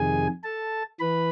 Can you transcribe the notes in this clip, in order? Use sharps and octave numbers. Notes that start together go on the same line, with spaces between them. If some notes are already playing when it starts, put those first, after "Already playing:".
Already playing: F2 C3 D#3 G#4 G#5
A4 A5
E3 B4 B5